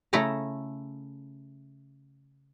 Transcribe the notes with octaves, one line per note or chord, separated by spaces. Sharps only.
C#3 A3 E4 A4 A#5